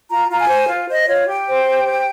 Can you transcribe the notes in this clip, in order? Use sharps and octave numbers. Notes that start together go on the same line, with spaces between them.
F4 A#5
F4 A#5
G#5
C5
F4
C5 D#5
F4 C#5
G4 G5
C5
G4
C5